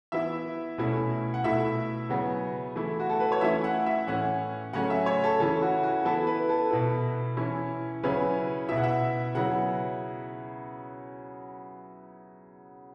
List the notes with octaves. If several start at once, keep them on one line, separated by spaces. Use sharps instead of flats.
E3 B3 E4 E5
B2 A3 C#4 E4
F#5
B2 A3 E4 E5
C#3 F#3 B3
E3 A3 E4
F#4
A4
B4
C#5
E3 A3 C#4 E4 E5
F#5
E5
A2 E3 C#4 F#5
C#3 F#3 A3 C#4 F#5
E5
C#5
A4
C#3 E3 C#4 E4 A4
F#4
F#4
E3 B3 E4 A4
B4
A4
B2 B3 E4
E3 C#4 E4
C#3 F#3 C#4 E4 B4
B2 B3 E4 E5
F#5
E5
C#3 F#3 B3 E4 F#5